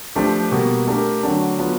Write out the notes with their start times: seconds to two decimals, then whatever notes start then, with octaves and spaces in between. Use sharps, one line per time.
0.15 F3 A3 D4 G4
0.51 B2 G3 A#3
0.87 A3 D4 G4 A#4
1.23 D3 F#3 A3 D4
1.59 F#3 B3 D4 F4